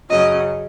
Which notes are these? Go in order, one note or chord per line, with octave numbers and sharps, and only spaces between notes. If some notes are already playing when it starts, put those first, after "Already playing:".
F#2 C#3 F#3 D#5